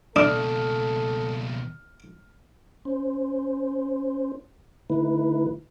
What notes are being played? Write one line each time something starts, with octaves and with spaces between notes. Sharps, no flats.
C#2 B2 D4 A4 D#6 F6
C#4 C5
D3 A3 D#4 E4 B4